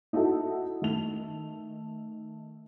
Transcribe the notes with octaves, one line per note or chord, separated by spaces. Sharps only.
D#4 E4 F#4 A4
D#3 A3 F7